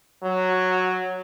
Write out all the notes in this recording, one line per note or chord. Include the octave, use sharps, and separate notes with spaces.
F#3